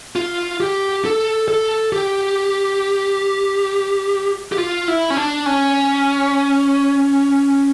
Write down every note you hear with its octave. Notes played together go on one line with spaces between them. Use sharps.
F4
G4
A4
A4
G4
G4
F4
E4
C#4
D4
C#4